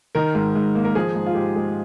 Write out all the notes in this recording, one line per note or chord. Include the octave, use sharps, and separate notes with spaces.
D#3 A#4
G#2
G#2
A#3
A#4
F3 G#4
G#2
F4
G#2 G4
G#3